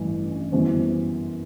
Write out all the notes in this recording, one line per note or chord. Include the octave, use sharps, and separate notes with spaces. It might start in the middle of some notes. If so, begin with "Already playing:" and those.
Already playing: A1 G2 E3
F#2 E3 G3 B3 C5